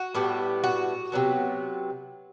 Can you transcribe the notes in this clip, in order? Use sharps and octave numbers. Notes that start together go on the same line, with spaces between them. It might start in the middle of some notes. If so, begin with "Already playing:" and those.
Already playing: F#4
A2 G3 B3
F#4
C3 F#3 B3